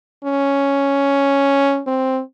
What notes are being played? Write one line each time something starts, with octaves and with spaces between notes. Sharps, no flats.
C#4
C4